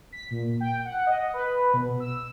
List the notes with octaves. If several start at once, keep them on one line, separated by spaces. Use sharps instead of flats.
B6
A#2
G5
F#5
D#5
B4
B2
E6